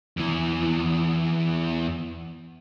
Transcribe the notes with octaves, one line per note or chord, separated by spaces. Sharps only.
E2 E3